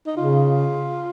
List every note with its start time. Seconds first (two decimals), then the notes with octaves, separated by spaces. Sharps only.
0.06 D#4
0.16 C#3 F4